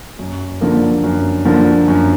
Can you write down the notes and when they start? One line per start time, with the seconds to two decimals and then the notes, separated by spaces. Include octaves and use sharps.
0.19 F#2
0.61 D3 F3 A#3
1.04 F#2
1.45 D3 F3 A#3
1.88 F#2